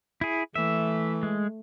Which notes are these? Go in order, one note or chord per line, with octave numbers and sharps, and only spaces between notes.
E4 G#4
E3 A3 E5
G#3